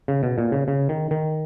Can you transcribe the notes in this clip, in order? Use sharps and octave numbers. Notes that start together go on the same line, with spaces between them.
C#3
B2
A#2
C#3
C#3
D#3
D#3